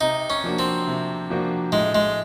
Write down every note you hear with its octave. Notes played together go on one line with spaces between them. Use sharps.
C3 D#4
C#4
F3 A#3 D4 F#4
C4
C3
F3 A#3 D4 F#4
A2 G#3
G#3